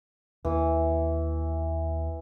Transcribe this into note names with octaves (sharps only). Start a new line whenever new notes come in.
D#2 E3 A#3